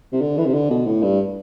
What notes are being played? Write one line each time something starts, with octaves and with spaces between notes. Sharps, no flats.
C3
D3
E3
C3
D3
B2
A2
G2